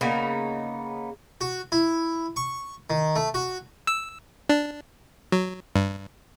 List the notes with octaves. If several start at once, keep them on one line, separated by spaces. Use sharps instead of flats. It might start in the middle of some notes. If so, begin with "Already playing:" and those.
C#3 A#3 B3 D#4
F#4
E4
C#6
D#3
A3
F#4
E6
D4
F#3
G2